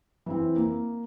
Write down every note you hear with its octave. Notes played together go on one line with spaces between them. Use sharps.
E3 C4
A#3